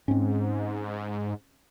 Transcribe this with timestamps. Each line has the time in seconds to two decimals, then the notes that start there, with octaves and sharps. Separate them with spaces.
0.08 G#2 C4 C#4